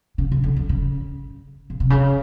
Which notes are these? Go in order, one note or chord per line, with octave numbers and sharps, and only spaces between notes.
C#3
C#3
D3
D3
C#3
C#3
C3
C#3